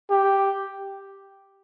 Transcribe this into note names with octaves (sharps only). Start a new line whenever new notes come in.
G4